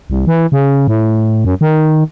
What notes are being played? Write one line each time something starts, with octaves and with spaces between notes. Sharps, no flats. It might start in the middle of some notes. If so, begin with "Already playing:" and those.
C2
E3
C#3
A2
F#2
D#3